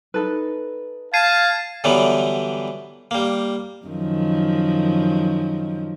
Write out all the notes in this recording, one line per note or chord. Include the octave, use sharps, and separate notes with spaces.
D#4 A4 B4
F5 A5 G#6 C7 D#7
D3 E3 F#3 G3 B3
G3 A#3
F#2 D#3 F3